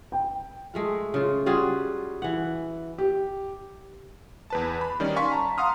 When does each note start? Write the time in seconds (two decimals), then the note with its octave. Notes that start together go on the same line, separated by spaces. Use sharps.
0.12 G5
0.74 G#3 A3 F4
1.14 C#3 F4
1.46 G3 F4 F#4 G#4
2.22 E3 F#5
2.98 G4
4.50 E2 B4 A5
4.81 B5
5.00 D#3 G3 C#4 D5
5.16 F5 G#5 C6 C#6 B6
5.32 A5 A#5
5.58 F5 F#5 A#5 C6 D#6 F6